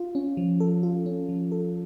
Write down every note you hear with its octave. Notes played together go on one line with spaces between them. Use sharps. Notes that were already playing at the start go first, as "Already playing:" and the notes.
Already playing: F4
C#4
F3
A4
F4
C#4
F3
A4